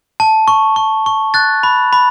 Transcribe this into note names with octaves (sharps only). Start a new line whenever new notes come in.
A5
C#6
C#6
C#6
F#6 A6
B5
B5